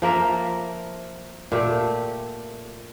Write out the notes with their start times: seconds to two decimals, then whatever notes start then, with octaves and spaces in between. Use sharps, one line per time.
0.02 F3 A#3 A#4 E5
1.52 A#2 A3 G4